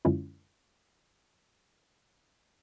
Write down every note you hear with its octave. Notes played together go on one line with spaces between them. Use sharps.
F#2 D3 G#3 C#4 E4 F4